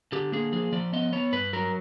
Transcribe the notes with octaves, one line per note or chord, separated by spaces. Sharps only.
D3 G4
A#3 G#4
F3 G#4
F3 D5
B3 D#5
B3 C#5
G2 B4
F#3 A#4